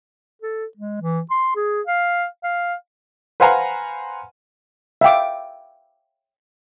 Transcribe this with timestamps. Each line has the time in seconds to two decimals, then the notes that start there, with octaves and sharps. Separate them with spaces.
0.42 A4
0.78 G#3
1.01 E3
1.31 C6
1.56 G#4
1.87 F5
2.44 F5
3.40 B4 C5 F5 F#5 G#5 A#5
5.01 E5 F5 G5 D6